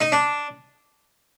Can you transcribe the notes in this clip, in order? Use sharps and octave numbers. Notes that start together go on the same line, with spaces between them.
D#4
D4